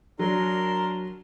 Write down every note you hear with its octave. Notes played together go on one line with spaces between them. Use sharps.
F#3 D4 A#4 C6